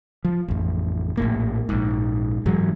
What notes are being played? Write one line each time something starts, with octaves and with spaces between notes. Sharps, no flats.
F3
A1 F2
A#1 A2 A#3
A#1 G#2
G#2 E3 F#3 G#3